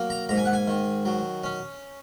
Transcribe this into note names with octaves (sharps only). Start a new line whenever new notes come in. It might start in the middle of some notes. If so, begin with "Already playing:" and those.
Already playing: F#3 A#3
A#5
G#2 A#5
G#5
F#5
G#5
D#3
F#3
C#4